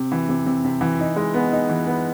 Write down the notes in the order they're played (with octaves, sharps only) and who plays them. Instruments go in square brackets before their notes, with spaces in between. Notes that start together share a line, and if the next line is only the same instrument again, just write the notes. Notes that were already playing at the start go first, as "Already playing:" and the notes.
Already playing: [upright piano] C3
E3
C3
C3
C3
E3
D#4
G#3
B3
D#4
E3
B3